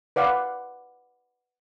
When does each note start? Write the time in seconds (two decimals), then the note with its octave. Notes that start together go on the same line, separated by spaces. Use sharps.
0.16 B4 D5 F5 F#5